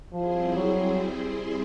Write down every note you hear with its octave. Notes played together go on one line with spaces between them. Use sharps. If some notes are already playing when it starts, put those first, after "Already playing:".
F3 G3 C4 E4 G#4 C5
F#3